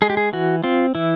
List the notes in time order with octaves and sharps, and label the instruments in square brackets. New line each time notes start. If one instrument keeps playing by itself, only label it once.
[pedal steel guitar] G#3 G#4
G4
G#4
E3 F#4
C4 F4
E3 E4